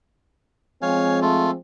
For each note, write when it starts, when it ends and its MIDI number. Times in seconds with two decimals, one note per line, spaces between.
0.82 1.54 53
0.82 1.54 56
0.82 1.54 60
0.82 1.19 73
0.82 1.19 77
0.82 1.19 80
1.22 1.51 57
1.22 1.51 65